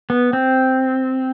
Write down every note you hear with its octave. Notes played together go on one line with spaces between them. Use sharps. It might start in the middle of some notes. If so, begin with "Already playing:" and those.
B3
C4